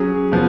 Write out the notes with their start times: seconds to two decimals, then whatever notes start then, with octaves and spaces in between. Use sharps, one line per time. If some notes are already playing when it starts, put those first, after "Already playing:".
Already playing: F#3 C#4 G#4
0.32 F3 B3